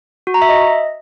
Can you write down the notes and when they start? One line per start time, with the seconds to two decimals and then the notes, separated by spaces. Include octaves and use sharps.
0.27 F#4
0.34 A#5
0.42 E5
0.49 D#5